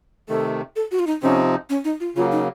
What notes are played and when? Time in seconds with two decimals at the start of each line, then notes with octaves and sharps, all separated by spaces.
0.29 C3 D#3 A3 A4
0.76 A4
0.91 F#4
0.99 F4
1.07 D#4
1.22 C3 F3 C4 C#4 D#4
1.70 C#4
1.85 D#4
2.00 F4
2.16 C#3 F#3 A#3 F4
2.32 D#4